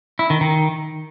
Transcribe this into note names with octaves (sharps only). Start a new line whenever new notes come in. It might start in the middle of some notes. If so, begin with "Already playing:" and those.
E4
D#3
D#3